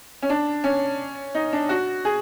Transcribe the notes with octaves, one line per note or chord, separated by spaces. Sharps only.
C#4
D4
C#4
D#4
D4
F#4
G#4